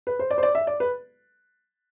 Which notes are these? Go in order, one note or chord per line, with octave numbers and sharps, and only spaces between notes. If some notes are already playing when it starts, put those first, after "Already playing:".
B4
C5
D5
C5
D5
E5
D5
B4